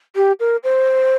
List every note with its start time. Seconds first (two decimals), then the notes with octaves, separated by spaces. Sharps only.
0.16 G4
0.40 A#4
0.64 C5